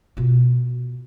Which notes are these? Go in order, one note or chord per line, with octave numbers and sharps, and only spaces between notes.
B2 F4